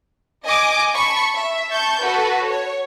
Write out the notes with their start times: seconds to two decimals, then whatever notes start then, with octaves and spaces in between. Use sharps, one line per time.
0.45 D#5 G#5 D6 D#6
0.94 A5 B5 C#6
1.35 E5
1.70 A5 C#6 G6
2.02 F#4 A4 B4
2.47 C#5